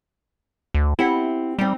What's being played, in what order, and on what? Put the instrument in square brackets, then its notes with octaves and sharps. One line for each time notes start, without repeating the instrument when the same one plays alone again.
[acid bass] D2
[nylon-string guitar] C4 G4 F#5 [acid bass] E4
[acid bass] G3 [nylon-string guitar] C4 D#4